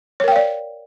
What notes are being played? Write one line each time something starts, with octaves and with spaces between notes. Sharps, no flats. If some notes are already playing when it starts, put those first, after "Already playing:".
A#4 C#5 D5 F5 G5